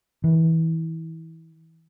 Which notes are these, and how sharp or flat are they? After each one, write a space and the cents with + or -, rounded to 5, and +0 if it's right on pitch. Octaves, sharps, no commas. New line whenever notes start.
E3 -25